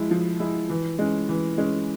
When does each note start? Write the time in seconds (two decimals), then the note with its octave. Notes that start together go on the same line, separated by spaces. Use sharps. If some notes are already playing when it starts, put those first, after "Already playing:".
Already playing: F3 G#3 E4
0.11 F3
0.40 G#3 E4
0.70 E3
0.99 G#3 C#4
1.29 E3
1.58 G#3 C#4